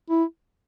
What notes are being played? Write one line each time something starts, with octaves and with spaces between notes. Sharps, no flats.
E4